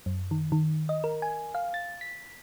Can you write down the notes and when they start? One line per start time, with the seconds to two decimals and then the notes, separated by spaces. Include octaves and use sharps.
0.06 F#2
0.31 D#3
0.52 D#3
0.89 D#5
1.04 A#4
1.22 G#5
1.55 F5
1.74 A6
2.01 B6